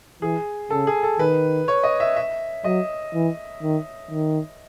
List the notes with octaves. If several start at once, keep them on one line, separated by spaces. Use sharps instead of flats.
E3 G#4
C#3 A4
G#4
A4
D#3 B4
C#5
D#5
E5
E5
F#3 D#5
E3
D#3
D#3